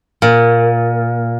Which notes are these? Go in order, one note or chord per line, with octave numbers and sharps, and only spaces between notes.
A#2